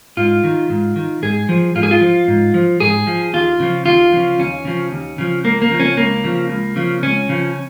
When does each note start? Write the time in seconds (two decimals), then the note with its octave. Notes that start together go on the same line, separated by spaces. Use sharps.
0.17 G#2 F4
0.44 D#3
0.70 G#2
0.96 D#3
1.22 G#2 G#4
1.49 F3
1.75 G#2 F4
1.83 G#4
1.91 F4
2.01 F3
2.28 G#2
2.54 F3
2.80 G#2 G#4
3.07 F3
3.33 D#2 F4
3.60 C#3 F3
3.86 D#2 F4
4.12 C#3 F3
4.39 D#2 C#4
4.65 C#3 F3
4.91 D#2
5.18 C#3 F3
5.44 C#2 A#3
5.62 A#3
5.71 C#3 F3
5.80 C#4
5.96 C#2 A#3
6.24 C#3 F3
6.50 C#2
6.76 C#3 F3
7.02 C#2 C#4
7.29 C#3 F3